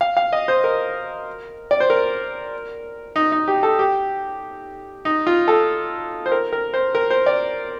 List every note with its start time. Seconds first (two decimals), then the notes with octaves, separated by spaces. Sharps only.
0.01 F5
0.17 F5
0.33 D#5
0.48 C5
0.64 A#4
1.71 D5
1.80 C5
1.90 A#4
3.16 D#4
3.32 D#4
3.48 G4
3.63 A4
3.79 G4
5.05 D#4
5.27 F4
5.48 A4
6.26 C5
6.32 A#4
6.53 A#4
6.74 C5
6.95 A#4
7.10 C5
7.26 D5